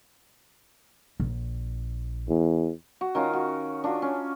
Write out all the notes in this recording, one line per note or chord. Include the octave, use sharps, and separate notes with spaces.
A#1
E2
F#4
D#3 C#4 F4
F#4
D4 F4 F#4
C#4